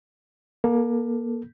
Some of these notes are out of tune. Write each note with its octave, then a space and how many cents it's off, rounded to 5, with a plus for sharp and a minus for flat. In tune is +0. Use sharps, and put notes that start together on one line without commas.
A#3 +30 A4 +0